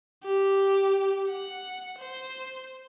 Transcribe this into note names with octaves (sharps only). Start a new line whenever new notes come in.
G4
F#5
C5